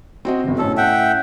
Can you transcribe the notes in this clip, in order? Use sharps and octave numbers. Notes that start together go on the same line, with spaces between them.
C4 F#4 D#5
G1 C3
A2 C#4 A4 D#5
E5 F#5 G5